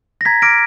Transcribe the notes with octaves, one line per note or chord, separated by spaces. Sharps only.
A#6
A#5 G#6 B6
D6 F6 A#6 D7